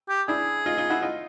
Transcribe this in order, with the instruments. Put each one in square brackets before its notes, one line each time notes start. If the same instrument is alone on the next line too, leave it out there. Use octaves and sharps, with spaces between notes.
[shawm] G4
[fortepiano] D4 E4 [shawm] G#4
[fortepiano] D#4 F4
D#4 F4
E4 F#4
D#4 F4